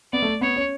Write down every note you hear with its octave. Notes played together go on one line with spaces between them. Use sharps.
B3 D5
A3
B3 C#5
C#4